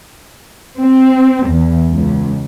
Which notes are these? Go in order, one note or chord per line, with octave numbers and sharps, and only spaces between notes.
C4
E2
C#2